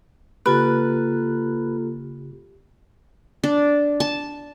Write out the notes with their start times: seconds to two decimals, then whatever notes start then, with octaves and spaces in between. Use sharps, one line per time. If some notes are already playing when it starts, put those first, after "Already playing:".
0.46 C#3 A#3 F4 G4 A4 B4 F#6
3.44 D4
4.00 A5